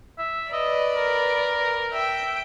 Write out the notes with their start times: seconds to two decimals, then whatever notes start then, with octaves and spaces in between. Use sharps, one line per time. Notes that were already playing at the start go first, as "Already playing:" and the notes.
0.18 E5
0.53 B4 D5 D#5
0.96 A#4
1.93 E5 G5